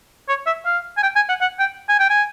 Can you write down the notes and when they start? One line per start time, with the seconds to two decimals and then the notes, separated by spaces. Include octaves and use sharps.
0.28 C#5
0.46 E5
0.66 F5
0.97 G#5
1.03 G5
1.16 G#5
1.29 F#5
1.41 F#5
1.59 G5
1.89 G#5
1.99 G5
2.10 G#5